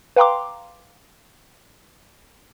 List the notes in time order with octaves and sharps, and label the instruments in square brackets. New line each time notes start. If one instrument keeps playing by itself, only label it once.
[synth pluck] B4 F5 G5 A#5 C6 D6